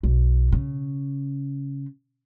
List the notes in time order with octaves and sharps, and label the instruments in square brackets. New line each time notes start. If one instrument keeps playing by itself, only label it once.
[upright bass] B1
C#3